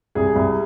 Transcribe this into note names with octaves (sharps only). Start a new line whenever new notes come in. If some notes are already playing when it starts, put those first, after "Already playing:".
C2 G#4
C2